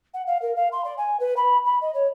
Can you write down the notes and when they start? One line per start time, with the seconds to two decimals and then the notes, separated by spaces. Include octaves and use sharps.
0.14 F#5
0.27 F5
0.42 A#4
0.56 F5
0.72 C6
0.85 D5
0.98 G#5
1.20 B4
1.37 B5
1.65 B5
1.81 D#5
1.94 C#5